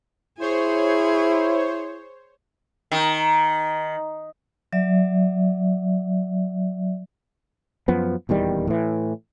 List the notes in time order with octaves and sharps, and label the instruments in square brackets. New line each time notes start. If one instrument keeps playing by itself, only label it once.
[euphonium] E4 [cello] G#4 [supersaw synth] C5 C#5
[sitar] D#3
[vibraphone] F#3 D5 E5
[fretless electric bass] F#2 F3 B3
D#1 E2 D#3 G3
A2 E3